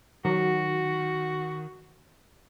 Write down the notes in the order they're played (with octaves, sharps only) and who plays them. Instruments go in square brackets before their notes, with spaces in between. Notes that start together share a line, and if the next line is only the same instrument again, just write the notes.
[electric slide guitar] D#3 [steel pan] F#3 [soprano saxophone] F#4